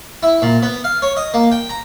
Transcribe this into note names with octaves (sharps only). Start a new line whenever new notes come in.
E4
A#2
B3
F5
C#5
D#5
A#3
G5
A#5